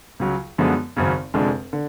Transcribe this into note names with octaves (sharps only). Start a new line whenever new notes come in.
C#2 C#3 F#3
F#2 D3 F3 G#3 B3
G#1 F#2 C#3
F1 F2 D3 G#3 D4
D3